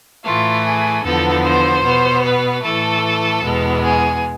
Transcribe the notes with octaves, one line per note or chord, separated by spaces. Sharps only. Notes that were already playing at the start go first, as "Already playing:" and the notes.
A2 E3 A3 F4
G#4
E2 D3 F3 B3 A4
C5
B2 B3
B4
A2 E3 A3 A4
E2 B2 G#3 B3
G#4